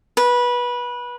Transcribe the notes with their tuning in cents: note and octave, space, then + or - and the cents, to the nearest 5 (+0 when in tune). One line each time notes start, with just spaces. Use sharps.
B4 -20